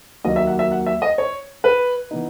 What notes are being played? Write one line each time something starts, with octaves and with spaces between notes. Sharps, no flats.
D#2 D#3 F#3 A#3 D#5
E5
F#5
E5
F#5
E5
D#5
C#5
B4
E3 B3 D#4